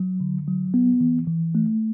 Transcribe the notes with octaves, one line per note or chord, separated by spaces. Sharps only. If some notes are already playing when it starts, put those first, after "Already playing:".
Already playing: F#3
D3
F#3
B3
E3
E3
A3